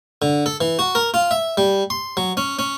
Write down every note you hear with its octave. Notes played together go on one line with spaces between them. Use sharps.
D3
A4
E3
F#4
A#4
F4
E5
G3
C6
F#3
C#4
C#4